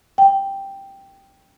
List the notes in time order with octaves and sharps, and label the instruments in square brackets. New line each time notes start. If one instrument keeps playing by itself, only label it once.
[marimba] G5